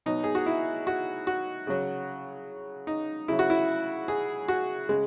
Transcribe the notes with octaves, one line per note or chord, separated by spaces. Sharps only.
B2 F#3 D#4
G#4
F#4
E4
F#4
F#4
C#3 F#3
D#4
C#3 F#3 E4
F#4
E4
G#4
F#4
C#3 G#3